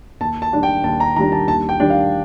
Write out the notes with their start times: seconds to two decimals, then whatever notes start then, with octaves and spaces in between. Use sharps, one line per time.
0.20 D#2 A5
0.42 A5
0.53 D#3 G3 D4
0.63 G5
0.84 D#2 A5
1.00 A#5
1.16 D#3 G3 D4 A#5
1.32 A5
1.47 D#2 A5
1.69 G5
1.80 D#3 G3 D4
1.90 F5